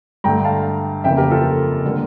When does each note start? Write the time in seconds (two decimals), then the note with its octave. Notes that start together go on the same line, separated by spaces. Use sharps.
0.24 G2 D3 A3 G5 A#5
0.44 F5 A5
1.04 F2 C#3 E3 A#3 E5 G5
1.17 G4 A#4
1.30 F4 A4
1.85 D3 G3 A#3